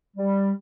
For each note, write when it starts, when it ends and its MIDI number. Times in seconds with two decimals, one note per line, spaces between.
0.17 0.51 55